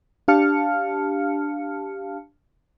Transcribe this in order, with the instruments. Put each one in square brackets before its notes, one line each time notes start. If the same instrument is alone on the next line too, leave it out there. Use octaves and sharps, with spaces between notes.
[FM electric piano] D4 G4 F5 A5 F6 C#7